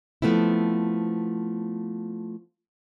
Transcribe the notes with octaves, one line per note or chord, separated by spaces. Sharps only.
F3 A3 B3 C4 E4